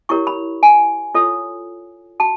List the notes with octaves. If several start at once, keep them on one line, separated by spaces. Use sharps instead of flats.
E4 G4 A#4 C#5 C#6
B5
G#5
F4 A4 C#5
F#4 A5